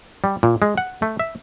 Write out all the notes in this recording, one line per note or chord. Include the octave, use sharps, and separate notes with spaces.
G3
A#2
G#3
F#5
A3
E5